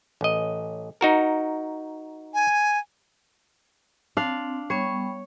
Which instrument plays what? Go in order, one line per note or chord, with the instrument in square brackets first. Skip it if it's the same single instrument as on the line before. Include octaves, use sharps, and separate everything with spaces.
[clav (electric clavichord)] A1 D#5
D#4 F#4 A#4
[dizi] G#5
[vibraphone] C4 [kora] D4 F5
[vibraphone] G3 B3 C#6 [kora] C#5